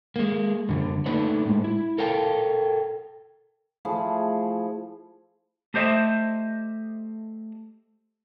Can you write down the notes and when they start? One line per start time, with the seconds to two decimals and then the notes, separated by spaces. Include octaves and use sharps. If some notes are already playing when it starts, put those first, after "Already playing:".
0.16 G#3 A#3
0.69 F#2 D3
1.06 A3 A#3 D4 D#4 B4 C#5
1.46 A2 G#3
1.64 E4
1.98 A4 A#4 C#5 F5 G5 A5
3.85 F3 A3 E4 G#4
5.74 A3 G4 C5 D#5 E5